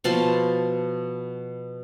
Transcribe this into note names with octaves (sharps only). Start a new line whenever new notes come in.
B2 F3 A5 C6